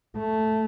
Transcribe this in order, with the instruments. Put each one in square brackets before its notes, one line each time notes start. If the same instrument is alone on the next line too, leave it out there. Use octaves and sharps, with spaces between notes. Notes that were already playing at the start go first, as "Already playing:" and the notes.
[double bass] A3